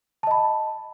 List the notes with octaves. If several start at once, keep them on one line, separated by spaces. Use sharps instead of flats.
D#5 A5 B5